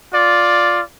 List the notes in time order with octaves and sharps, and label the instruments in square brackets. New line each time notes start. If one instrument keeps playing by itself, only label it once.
[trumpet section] F4 D5